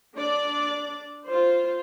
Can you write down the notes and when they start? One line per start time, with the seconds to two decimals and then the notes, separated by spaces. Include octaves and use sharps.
0.15 D4 D5
1.26 F4 C5